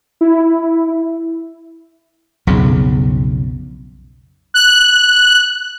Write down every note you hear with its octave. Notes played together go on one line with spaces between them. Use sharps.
E4
B1 F2 C#3
F#6